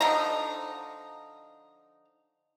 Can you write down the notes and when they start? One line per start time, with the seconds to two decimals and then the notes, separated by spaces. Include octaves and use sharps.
0.01 D3 F3 D#4 A#5